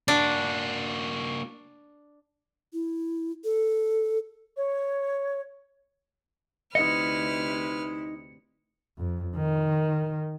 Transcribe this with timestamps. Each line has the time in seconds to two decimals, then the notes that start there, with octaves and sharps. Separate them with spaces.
0.08 A#3 D4 F#4
2.73 E4
3.44 A4
4.57 C#5
6.75 D2 C3 D#4 E4 B4 D#5 F6 C#7
8.98 F2
9.36 D#3